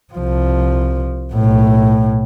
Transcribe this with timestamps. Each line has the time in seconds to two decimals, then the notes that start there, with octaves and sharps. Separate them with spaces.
0.14 C2 F3
1.33 B1 A2